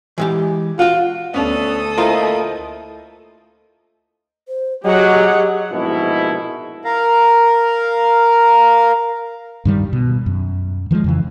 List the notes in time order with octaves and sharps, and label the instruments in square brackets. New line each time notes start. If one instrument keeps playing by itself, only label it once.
[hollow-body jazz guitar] E3 G#3 G4
[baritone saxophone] F4 [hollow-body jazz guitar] F#4 F#5
[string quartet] D2 A4 D#6 [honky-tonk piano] B3 C#4 D4
[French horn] A3 [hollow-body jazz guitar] A#3 E4 F4 [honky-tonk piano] A#4 C5 D#5
[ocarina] C5
[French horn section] F#3 [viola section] G4 F#5 [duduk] G#4 [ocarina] D#5
[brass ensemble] A#1 G#2 B2 E4
[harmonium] A#4 F5 A#5
[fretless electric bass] G2 D#3 G3
B2
F#2
D#3 F3 G3 G#3
F2 C#3 E3